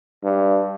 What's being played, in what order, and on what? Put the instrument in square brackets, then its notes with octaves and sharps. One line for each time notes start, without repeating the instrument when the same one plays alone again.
[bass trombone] G2